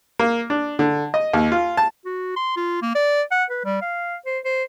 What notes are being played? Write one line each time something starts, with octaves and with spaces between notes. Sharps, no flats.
A#3
D4
D3
D#5
D#2
F4
A5
F#4
C6
F4
A#3
D5
F#5
B4
G3
F5
C5
C5